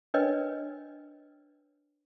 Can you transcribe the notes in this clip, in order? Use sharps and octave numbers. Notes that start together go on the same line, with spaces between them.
D4 A#4 B4 C#5 D#5 G5